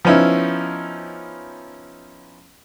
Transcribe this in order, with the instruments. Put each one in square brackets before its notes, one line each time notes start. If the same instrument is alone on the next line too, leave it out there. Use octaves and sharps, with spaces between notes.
[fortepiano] F3 B3 C#4 D#4 E4